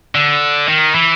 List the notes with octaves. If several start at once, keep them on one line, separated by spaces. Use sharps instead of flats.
D3
D#3
E3